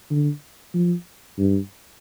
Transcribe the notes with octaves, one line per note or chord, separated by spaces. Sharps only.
D3
F3
G2